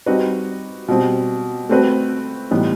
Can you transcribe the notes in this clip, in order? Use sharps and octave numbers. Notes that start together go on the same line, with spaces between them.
G3 C4 D#4 F#4 B4
B2 G3 C4
A3 C4 F#4 B4
A2 E3 G3 B3 D#4